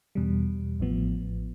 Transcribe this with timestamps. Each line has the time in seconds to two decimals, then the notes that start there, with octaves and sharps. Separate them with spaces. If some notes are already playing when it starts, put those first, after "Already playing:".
0.15 E2 B2 G3
0.80 A1 A2 F3 B3